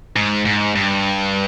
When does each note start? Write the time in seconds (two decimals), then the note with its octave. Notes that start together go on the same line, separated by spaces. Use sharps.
0.16 G#2
0.45 G#2
0.75 G2